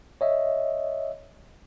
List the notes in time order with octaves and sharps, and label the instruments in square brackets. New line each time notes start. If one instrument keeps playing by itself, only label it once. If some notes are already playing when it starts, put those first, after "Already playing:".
[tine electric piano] C#5 D#5 E5